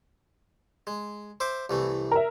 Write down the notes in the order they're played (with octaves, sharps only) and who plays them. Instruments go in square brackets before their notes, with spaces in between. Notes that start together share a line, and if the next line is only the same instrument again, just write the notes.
[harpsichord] G#3
C5 E5 D6
C2 E3 A3
[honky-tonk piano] A#4 E5